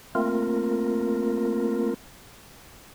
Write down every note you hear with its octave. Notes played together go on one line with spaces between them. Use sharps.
A3 A#3 C4 F4 A#4